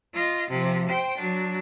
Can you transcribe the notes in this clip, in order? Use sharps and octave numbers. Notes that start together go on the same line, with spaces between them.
F4 D#5
C3 F3
C5 G5
F#3 D4